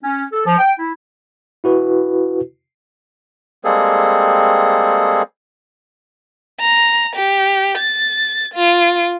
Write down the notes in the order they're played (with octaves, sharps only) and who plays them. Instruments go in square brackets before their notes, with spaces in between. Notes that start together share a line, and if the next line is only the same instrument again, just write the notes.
[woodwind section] C#4
A4
F3
G5
E4
[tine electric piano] E4 F#4 B4
[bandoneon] G3 G#3 A#3 C4 G#4 A4
[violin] A#5
G4
A6
F4